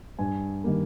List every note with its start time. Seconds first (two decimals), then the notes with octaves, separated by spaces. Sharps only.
0.19 G2 G#5
0.64 D#3 G3 A#3